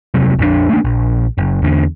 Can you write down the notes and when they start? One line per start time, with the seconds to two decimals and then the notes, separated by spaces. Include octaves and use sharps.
0.14 F1 C3 F#3
0.39 A#1 F2 D#3 D4
0.69 A3 A#3 C4 D4
0.84 A#1
1.38 F#1
1.62 E2 D3